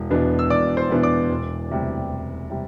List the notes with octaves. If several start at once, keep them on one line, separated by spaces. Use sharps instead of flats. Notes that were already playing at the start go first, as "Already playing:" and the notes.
Already playing: E1
E2 B2 B3 D4
E6
E1 D5 D6
C5 C6
E2 B2 B3 D4
D5 D6
E1
D2 C3 G3
E1
C3 G3